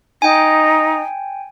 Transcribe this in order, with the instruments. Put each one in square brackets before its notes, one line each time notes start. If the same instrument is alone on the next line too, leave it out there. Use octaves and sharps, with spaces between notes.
[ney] D#4 [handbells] G5 G#5